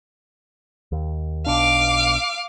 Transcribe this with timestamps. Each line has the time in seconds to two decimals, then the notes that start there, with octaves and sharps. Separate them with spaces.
0.92 D#2
1.46 B1 B2 D4 F5 D6